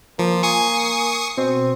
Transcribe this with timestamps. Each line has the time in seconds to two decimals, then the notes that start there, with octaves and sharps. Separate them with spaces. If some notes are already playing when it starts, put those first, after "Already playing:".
0.19 F3 A#3
0.43 G#5 C#6 D#6 C7
1.37 B2 C4